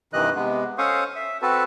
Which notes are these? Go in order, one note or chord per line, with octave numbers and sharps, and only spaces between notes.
G2 C3 D#3 E3 D#5 F#6
C3 G#3 B3
C#4 A4 C5 F5 C#6 D#6
E5
C4 F#4 A4 B4 A5